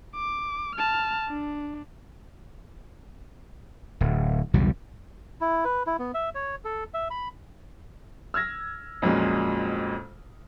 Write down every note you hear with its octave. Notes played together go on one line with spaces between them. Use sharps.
D6
A5 F6
D4
D1
B1 E2 C#3 G3
E4
B4
E4
B3
E5
C#5
A4
E5
B5
E6 F6 G#6 A#6
F2 A#2 F#3 G#3 C#4